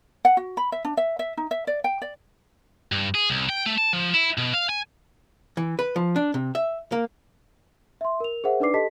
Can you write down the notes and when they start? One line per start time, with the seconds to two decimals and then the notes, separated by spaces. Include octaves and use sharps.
0.25 F#5
0.37 F#4
0.57 B5
0.72 E5
0.85 D4
0.97 E5
1.19 E5
1.37 D#4
1.51 E5
1.67 D5
1.84 G5
2.02 D5
2.92 G2
3.15 G#4
3.30 C2
3.49 G5
3.66 A3
3.78 A5
3.93 F3
4.14 E4
4.38 B2
4.54 F5
4.69 G#5
5.57 E3
5.79 B4
5.96 F3
6.16 D4
6.34 C3
6.55 E5
6.92 A#3
8.01 E5 C6
8.20 A#4 F7
8.44 G#4 A#4 C5 E5 F#5
8.60 D4 D#4 B4 D5 D6 C7
8.74 G4 A4 D#5 A5 B6